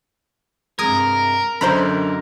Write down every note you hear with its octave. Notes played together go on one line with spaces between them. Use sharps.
G2 C3 G#3 A#4 D#6 G#6
F#2 D3 D4 C5 D#5 A#5 B5